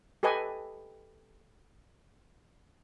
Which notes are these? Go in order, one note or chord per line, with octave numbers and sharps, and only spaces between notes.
G4 A4 B4 D#5 G#5